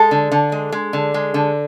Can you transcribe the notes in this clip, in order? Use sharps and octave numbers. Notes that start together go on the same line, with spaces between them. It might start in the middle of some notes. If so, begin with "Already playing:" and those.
Already playing: G#3 A4
D3
D3
G#3
G#3
D3
G#3
D3